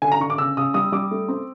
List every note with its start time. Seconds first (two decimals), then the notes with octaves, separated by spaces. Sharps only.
0.02 D3 G#5
0.12 A#5
0.20 D3 C#6
0.30 D6
0.38 C#3 E6
0.57 C#3 D#6
0.74 G3 D#6
0.92 G3 D6
1.11 A3
1.29 C4